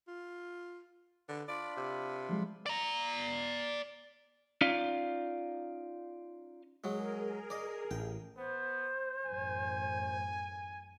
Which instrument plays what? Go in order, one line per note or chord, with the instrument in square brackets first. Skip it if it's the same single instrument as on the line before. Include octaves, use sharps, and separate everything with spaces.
[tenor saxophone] F4
[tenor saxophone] D3 [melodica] B4
[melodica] D4 F4 B5 [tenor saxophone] D5
[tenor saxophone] C3
[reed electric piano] F3 F#3 G#3
[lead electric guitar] D5 A#5
[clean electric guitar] C#4 D#4 F4 D5 F5
[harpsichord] F#3 G#3 [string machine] G#4 A#4
[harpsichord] D5 D#5
[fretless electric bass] A1 [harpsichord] G5
[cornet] B3 [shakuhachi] C5
[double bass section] A1 F#2 [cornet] G#5